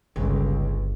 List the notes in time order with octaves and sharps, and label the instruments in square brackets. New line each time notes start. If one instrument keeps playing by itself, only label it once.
[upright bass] G1 [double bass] C#2